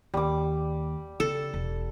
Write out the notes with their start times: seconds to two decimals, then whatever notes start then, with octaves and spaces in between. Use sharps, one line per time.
0.14 D#2 G3 D6
1.20 C#3 A4
1.54 E1